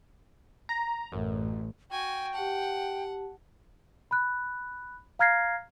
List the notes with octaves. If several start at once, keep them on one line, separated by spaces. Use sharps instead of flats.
A#5
A1 F#2
F#4 G5 G#5
G4 F#5 A5
B5 F#6
F5 A#5 F6 G#6 A#6 C7